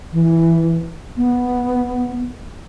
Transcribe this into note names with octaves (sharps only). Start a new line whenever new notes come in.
E3
B3